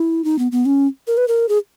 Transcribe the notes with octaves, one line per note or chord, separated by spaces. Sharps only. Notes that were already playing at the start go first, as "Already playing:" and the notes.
Already playing: E4
D#4
B3
B3
C#4
A#4
B4
A#4
G#4